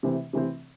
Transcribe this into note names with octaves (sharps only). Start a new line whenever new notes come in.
C3 E3 A3 C4
C3 E3 A3 C4